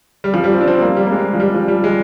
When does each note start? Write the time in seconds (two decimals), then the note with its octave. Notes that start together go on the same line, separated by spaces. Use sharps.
0.24 G3
0.34 F3
0.44 G3
0.53 C4
0.61 D4
0.68 C4
0.82 A#3
0.97 G3
1.06 A#3
1.11 G#3
1.34 F3
1.40 G3
1.54 F3
1.68 G3
1.84 G#3